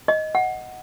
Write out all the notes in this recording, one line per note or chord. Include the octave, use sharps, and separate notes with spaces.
D#5
F#5